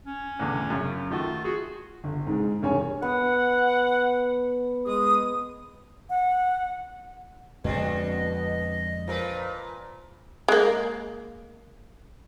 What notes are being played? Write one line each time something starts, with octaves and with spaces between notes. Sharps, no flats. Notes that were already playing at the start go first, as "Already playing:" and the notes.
C#4
E2 A2 D3
F#2 C#3
D#3 A3 F4 F#4
F#4 G#4
G1
G#2 G#3
E1 G2 C#5 G#5
B3 F#5
G#3 G#4 D#6
F#5
F2 B2 D3 G#3 C4 D4 F#4 D#5
A#2 F3 A#4 B4
G#3 A#3